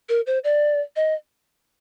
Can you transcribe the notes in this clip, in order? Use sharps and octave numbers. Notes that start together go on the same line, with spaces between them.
A#4
C5
D5
D#5